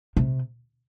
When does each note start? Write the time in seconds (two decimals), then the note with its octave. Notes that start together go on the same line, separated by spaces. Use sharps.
0.17 C3